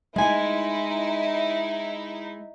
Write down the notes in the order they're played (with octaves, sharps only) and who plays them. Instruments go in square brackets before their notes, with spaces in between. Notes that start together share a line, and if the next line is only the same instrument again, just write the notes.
[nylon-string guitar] G#3 G#5 [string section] D#4 E4